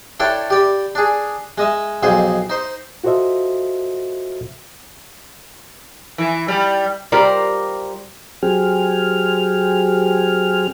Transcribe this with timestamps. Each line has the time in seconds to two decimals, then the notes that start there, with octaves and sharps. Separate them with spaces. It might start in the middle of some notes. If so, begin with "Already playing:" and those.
0.20 D4 E4 A4 C#5 G5
0.50 G4 D5 B5
0.95 D4 G#4
1.58 G#3 D#5 E5
2.03 B1 F2 G#4 C5
2.50 D#4 C5
3.04 F4 F#4 A4 C5 D#5 E5
6.18 E3
6.48 G3
7.12 G3 F4 G4 A#4 C5 D5
8.43 F#3 C4 G4 G#4 F6